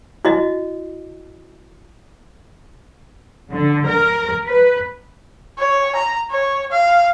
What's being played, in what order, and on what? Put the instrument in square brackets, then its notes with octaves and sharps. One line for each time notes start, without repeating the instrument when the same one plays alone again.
[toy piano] E4 F#4 D#5
[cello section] D3
A#4
B4
[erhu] C#5
A#5
C#5
F5